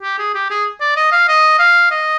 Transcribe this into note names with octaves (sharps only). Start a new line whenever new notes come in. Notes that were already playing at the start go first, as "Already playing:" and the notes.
G4
G#4
G4
G#4
D5
D#5
F5
D#5
F5
D#5